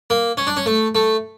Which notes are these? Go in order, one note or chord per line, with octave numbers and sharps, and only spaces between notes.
A#3
C#4
D4
C#4
A3
A3